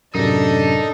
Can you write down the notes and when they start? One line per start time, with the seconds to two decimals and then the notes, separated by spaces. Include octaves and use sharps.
0.15 F#2 A2 C3 D4 D#4 A4